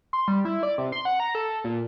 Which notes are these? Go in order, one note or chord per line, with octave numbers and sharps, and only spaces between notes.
C6
G3
E4
D5
C3
C6
F#5
A#5
A4
A#2